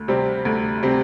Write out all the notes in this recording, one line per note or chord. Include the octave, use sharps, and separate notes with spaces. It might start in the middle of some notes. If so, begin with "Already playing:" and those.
Already playing: D2
C3 G3 C4
D2
C3 G3 C4